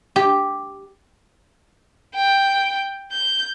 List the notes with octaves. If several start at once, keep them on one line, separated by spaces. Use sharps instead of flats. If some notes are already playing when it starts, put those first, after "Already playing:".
G4
G5
G6